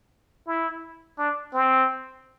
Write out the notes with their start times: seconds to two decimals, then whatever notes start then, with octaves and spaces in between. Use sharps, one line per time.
0.47 E4
1.18 D4
1.54 C4